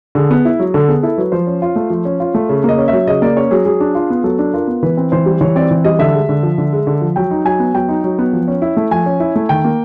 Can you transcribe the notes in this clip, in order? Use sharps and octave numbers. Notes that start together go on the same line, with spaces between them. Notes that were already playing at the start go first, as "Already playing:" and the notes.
D3 G#4
B3
E4
F#3
D3 A4
B3 G#4
E4 A4
F#3 B4
F3 C5
C#4
F4
A3
F3
C#4
F4
A3
C#3
A#3 D#5
C#4
F#3 E5
C#3 D#5
A#3 D5
C#4 C#5
F#3 G#4
F#3 G#4
D4
F4
B3
F#3 A4
D4
F4 A#4
B3
E3 B4
C4
E3 C5
G3
E3 C#5
C4 D5
E3
G3 D#5
D3 E5
G#3
D3
F3
D3
G#3
D3
F3
F#3 G5
D#4
F#3 G#5
B3
F#3 G5
D#4
F#3
B3
F3
C#4
E4
A3
F3 G#5
C#4
E4
A3
D#3 G5
A#3